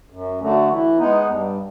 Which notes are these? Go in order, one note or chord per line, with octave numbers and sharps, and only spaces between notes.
F#2
D3 F#3 A3
E3
G#3 B3 D#4
G2